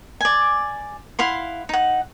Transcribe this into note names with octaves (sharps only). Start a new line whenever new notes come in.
D5 G#5
E4 F5 F#5 C6
D#4 F#5